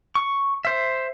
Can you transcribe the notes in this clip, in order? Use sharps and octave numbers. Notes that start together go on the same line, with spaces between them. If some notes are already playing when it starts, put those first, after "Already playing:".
C#6
C5 E5